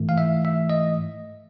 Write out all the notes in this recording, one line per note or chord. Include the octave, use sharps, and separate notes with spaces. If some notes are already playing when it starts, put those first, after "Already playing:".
Already playing: G#2 E3 A3
F5
E5
E5
D#5